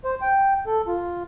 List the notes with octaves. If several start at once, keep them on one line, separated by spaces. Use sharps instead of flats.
C5
G5
A4
F4